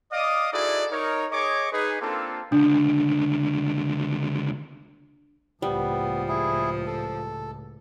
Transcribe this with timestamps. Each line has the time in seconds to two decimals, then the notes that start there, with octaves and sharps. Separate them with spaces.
0.12 D5 D#5 F5 D6 D#6
0.53 D#4 E4 F#4 G#4 A4 D5
0.92 D#4 A#4 C#5
1.32 G#4 C#5 D#5 C#6 D6
1.72 D#4 G#4 B4
2.01 A#3 C4 D4 F4 A4
2.52 C#2 D3 D4
5.62 C#2 A2 F3 G3 B3
6.28 E4 G#4
6.87 A4